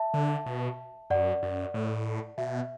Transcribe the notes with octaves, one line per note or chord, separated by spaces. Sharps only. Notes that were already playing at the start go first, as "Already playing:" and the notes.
Already playing: E5 A5
D3
B2
F#2 D5 F#5
F#2
A2
B2 E5